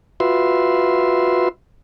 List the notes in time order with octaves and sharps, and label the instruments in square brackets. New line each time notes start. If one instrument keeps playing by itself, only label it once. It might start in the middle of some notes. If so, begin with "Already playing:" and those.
[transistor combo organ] F4 F#4 B4 E5 C6